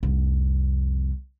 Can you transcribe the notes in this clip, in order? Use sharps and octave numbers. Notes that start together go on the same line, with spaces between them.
C2 F2